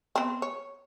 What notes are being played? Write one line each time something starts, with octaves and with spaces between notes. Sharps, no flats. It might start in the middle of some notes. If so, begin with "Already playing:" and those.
B3 C4
C#5